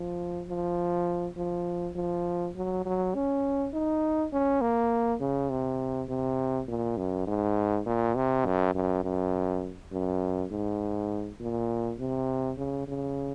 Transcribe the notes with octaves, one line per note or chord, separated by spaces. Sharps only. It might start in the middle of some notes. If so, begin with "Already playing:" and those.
Already playing: F3
F3
F3
F3
F#3
F#3
C#4
D#4
C#4
A#3
C#3
C3
C3
A#2
F#2
G#2
A#2
C3
F#2
F#2
F#2
F#2
G#2
A#2
C3
C#3
C#3